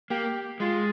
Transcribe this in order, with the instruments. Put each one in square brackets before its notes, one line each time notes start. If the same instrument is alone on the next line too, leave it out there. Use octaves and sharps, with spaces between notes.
[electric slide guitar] A#3 [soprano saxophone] G4
[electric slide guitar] G#3 [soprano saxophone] F4